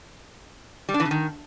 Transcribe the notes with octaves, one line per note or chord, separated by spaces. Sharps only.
G3
D4
E3
C#3
D#3